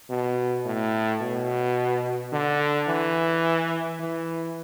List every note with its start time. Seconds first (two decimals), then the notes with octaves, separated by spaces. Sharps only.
0.09 B2
0.65 A2
1.21 B2
2.32 D3
2.88 E3
4.00 E3